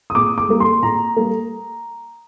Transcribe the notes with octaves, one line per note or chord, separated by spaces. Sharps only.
D#6
A#2 D6
D6
G3 A#3
C6
A#2 A#5
G3 A#3